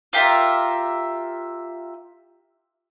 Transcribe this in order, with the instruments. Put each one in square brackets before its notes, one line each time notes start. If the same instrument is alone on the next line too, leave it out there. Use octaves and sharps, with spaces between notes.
[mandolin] F4 G4 A#4 E5